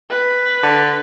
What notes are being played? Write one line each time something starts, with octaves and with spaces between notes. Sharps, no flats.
B4
D3